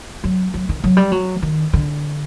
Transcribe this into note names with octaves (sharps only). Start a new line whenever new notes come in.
F#3
F#3
D#3
F#3
G3
F#3
D#3
D3